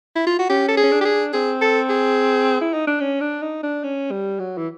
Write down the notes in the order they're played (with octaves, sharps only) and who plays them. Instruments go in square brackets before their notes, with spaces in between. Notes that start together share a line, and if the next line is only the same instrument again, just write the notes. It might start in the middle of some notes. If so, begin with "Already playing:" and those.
[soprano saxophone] E4
F4
F#4
[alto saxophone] C#4 [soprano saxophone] G4
[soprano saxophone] A4
G#4
[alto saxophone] C#4
D4
[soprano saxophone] G4
G#4
[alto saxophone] C4 [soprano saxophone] G#4
[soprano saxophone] A4
G#4
[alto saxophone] E4
D#4
D4
C#4
D4
D#4
D4
C#4
G3
F#3
E3